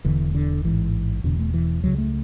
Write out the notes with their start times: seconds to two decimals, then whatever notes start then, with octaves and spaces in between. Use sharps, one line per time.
0.05 E1 E2 D3 E3
0.35 D3
0.64 A1 G#2 E3
1.24 E1 E2 B2 D3
1.39 A3
1.54 E3
1.83 C#2 C#3 F#3
1.98 A3